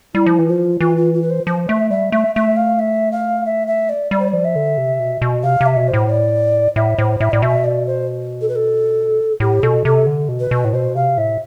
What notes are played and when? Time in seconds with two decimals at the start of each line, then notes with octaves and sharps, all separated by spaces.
0.14 G3 E4
0.26 F3
0.39 E3
0.48 F3 F4
0.80 E3 F4
0.96 F4
1.14 F4
1.22 B4
1.30 C5
1.46 F3 C5
1.69 A3 E5
1.90 G3 E5
2.12 A3 E5
2.35 A3 E5
2.56 F5
2.79 E5
3.12 F5
3.45 E5
3.67 E5
3.89 D5
4.11 G3 D5
4.20 C5
4.28 F3 D5
4.44 E5
4.56 D3
4.78 C3
5.00 B2
5.22 B2
5.43 C3 F5
5.61 C3
5.66 E5
5.77 B2
5.88 C5
5.93 A2
6.09 D5
6.76 A2 E5
6.98 A2 C5
7.20 A2 E5
7.32 A2 D5
7.42 B2 E5
7.64 D5
7.86 C5
8.41 A4
8.48 B4
8.55 A4
9.40 A2 G4
9.63 B2 A4
9.85 C3 A4
10.07 D3
10.29 B2
10.40 B4
10.51 B2
10.65 A2
10.73 B2 C5
10.95 C3 F5
11.17 A2 E5